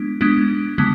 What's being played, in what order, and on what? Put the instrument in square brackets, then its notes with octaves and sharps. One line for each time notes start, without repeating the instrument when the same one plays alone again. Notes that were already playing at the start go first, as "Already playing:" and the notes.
Already playing: [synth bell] G#3 B3 D4
G#3 B3 D4
D3 G#3 B3